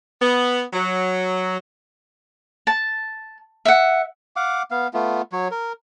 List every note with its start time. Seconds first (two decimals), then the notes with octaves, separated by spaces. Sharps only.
0.21 B3
0.73 F#3
2.67 A5
3.65 E5 F#5
4.36 F5 F#5 D6
4.71 B3 F5
4.94 A3 B3 F4
5.32 F#3 C#5
5.51 A#4